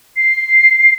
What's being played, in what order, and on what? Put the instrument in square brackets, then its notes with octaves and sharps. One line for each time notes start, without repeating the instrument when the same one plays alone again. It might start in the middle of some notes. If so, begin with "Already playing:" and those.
[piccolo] C7